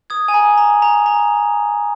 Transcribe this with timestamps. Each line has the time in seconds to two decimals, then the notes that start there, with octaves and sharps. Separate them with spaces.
0.10 D#6 G#6
0.28 G#5
0.34 A#5
0.58 A#5
0.82 A#5
1.06 A#5